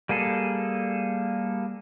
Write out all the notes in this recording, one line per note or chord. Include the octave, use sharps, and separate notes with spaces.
G3 A#3 G#4 A4